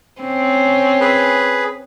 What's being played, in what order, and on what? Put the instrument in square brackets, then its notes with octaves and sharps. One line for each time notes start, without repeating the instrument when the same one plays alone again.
[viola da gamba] C4 C#4
[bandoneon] G#4 B4